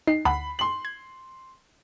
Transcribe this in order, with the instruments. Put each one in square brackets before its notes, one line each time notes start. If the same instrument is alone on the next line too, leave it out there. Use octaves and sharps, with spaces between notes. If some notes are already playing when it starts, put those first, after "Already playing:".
[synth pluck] D#4 [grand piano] C7
[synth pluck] D2 F#5 [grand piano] B5
[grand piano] C6 F#7 [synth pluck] B6
[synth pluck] G#6